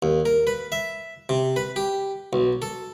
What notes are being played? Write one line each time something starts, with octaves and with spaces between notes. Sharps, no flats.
D#2
A#4
B4
E5
C3
B4
G4
B1
A4